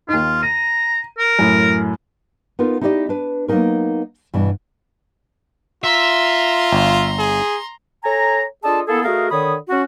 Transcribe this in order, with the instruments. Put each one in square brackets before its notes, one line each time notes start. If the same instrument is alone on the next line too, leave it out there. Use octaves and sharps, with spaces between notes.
[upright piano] D#2 D#4 [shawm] F4
[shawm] A#5 [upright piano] D#7
[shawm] A#4
[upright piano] F#2 A2
[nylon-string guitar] B3 D#4 F4 A#4
D#4 E4 G4 C5 D5 D#5
D4 B4
F#3 A#3 B3 D4 D#4 A#4
G2 B2 E3 B3
[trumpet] F4 [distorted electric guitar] E5 [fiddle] A#5 C6
[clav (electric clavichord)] G1
[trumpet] G#4
[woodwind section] A4 C#5 G#5 A#5
D4 F4 G#4 A4 D#5 A5
A#3 B3 E4 G#4 A4
A3 F#4 G#4 A#4 D#5 F5
D3 D#3 C#5 B5 D#6
C#4 F#4